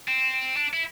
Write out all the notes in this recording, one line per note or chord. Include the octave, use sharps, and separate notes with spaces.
C4
D4
E4